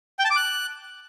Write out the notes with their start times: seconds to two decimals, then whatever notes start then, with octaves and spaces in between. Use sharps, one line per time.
0.19 G5
0.25 A5
0.30 D6
0.36 F#6